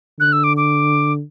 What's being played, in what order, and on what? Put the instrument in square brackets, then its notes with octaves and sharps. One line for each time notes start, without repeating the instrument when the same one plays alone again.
[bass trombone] D3 [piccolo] F#6
[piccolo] E6
D6
D6